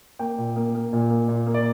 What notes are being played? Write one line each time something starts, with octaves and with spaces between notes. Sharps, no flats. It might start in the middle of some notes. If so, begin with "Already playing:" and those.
A#3 G5
A#2
A#3
A#3
A#2
A#3
A#2
A#3
D5